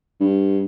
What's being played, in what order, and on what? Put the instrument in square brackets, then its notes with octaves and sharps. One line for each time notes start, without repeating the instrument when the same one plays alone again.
[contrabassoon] G2